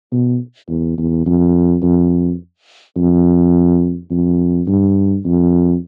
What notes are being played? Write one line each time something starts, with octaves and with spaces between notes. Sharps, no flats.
B2
E2
E2
F2
F2
F2
F2
G2
F2